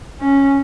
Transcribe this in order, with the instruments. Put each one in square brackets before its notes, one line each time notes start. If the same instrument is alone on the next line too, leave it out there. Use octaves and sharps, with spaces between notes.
[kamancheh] C#4